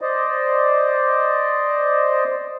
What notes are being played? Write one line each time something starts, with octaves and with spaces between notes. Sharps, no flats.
C5 D5 D#5